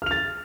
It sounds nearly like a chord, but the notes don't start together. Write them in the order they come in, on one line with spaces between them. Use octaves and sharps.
F6 F7 A6